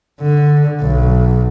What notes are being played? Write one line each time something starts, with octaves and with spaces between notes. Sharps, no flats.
D3
B1